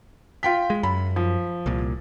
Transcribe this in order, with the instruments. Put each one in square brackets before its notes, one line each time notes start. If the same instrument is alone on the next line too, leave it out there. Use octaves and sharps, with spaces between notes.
[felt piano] F4 G5 B6
[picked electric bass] G#3
[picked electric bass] F#2 [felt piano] B5
[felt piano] F3
[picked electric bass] C2 A#2